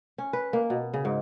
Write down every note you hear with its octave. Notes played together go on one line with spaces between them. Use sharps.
C#4
B4
A#3
B2
C#3
G#2